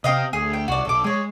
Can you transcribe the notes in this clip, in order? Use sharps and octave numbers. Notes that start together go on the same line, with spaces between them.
C3 C4 D#5 F5 G5
D2 G#4
G5
C2 F#4 D5
D1 B1 A4 D6
G#3 G#4 C#5